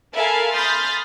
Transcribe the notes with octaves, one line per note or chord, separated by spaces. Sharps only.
A4 A#4 E5 F5 G#5 B5
B5 C6 D#6 F6 G6 A6